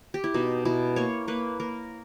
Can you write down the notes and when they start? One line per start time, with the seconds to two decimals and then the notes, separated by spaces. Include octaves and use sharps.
0.14 G4
0.24 E4
0.34 B2 D#4
0.65 B2 E4
0.96 A#3 C#5
1.28 A#3 B4
1.60 A#3 A#4